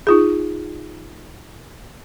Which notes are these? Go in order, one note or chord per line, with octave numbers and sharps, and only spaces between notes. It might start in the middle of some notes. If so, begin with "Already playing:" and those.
D#4 F4 G#4